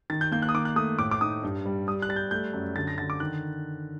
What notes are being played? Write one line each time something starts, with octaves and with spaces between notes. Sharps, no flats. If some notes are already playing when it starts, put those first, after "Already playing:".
D#3 A6
G6
A#3 G6
F#6
D#6
D#3 D6
F#6
A3 D#6
A2 D6
D6
D#4 D#6
G2
G3
G3 D#6
F#6
G3 A6
G6
A3 G6
F#2
D3 A6
A#6
D3 A6
D6
D#3 F#6